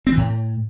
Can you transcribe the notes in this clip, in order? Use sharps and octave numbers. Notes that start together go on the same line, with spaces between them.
C4
E3
A2